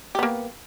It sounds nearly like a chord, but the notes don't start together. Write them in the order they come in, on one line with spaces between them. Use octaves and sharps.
G4 B3 A#3